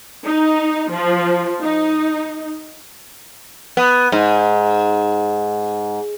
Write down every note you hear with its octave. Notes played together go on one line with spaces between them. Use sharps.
D#4
F3
D#4
B3
G#2